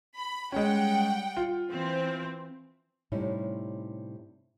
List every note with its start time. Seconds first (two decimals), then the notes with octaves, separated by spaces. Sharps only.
0.16 B5
0.52 G3 G#3 C#4 F#5 G5
1.37 F4
1.71 E3 C4
3.12 A2 C3 G3 C#4 D#4 E4